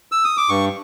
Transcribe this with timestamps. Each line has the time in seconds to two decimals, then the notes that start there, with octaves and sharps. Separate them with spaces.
0.12 E6
0.24 D#6
0.37 D6
0.49 G2 C#6